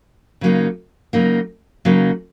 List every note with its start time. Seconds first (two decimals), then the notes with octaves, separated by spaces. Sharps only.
0.41 C#3 F#3 A#3 D#4
1.13 C#3 F#3 A#3 D#4
1.85 C#3 F#3 A#3 D#4